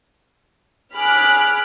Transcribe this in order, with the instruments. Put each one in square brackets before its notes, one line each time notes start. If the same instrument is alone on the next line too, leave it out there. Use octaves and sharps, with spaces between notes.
[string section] G#4 B5 D6 F6 F#6